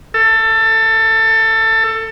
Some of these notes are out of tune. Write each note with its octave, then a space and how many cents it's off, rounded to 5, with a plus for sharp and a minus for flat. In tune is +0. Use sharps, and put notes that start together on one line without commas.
A4 +20